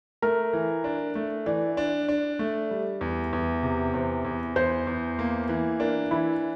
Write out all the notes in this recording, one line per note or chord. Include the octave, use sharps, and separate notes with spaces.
A3 A#4
E3
D4
A3
E3 D5
D4
D4
A3
G3
E2
E2
C3
E2 C5
E2
E2 C5
E2
A#3
E3
D4 A#4
E3 E4